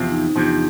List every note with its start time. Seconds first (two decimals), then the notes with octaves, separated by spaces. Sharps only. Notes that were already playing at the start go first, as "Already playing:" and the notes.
Already playing: E2 C3 F3
0.10 D#4
0.36 E2 C3 F3 D4